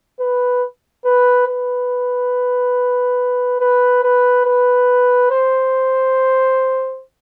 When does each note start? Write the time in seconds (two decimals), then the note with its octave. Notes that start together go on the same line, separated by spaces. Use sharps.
0.20 B4
1.05 B4
1.47 B4
3.60 B4
4.03 B4
4.45 B4
5.31 C5